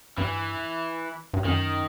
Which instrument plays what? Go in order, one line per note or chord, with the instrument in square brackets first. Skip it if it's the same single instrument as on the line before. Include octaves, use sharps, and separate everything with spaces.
[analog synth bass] G2 [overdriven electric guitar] E3
[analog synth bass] G2
[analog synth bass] F#2 [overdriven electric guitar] D#3